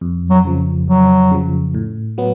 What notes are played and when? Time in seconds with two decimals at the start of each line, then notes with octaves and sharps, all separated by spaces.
0.01 F2
0.30 F#3
0.45 C#3 F3
0.88 F2 F#3
1.31 C#3 F3
1.74 A2
2.18 F#3 B3